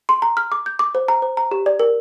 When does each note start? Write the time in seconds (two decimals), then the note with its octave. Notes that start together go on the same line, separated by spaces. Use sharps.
0.09 C6
0.22 A#5
0.37 F6
0.52 D6
0.66 G6
0.79 D6
0.95 C5
1.08 A#5
1.22 C5
1.37 A#5
1.51 G4
1.66 D5
1.80 A#4